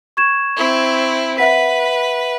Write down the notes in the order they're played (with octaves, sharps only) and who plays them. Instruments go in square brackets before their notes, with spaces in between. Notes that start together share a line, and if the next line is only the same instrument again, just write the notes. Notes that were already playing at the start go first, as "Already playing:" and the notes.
[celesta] C#6 G#6 E7
[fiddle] C4 E4
[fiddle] B4 [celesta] E5 F#5 B6